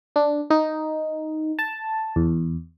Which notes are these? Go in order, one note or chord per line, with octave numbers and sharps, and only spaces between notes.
D4
D#4
A5
E2